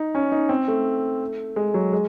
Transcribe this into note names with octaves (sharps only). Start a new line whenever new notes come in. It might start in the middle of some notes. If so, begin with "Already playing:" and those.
Already playing: D#4
C#4
D#4
C4
A3
G#3
F#3
G#3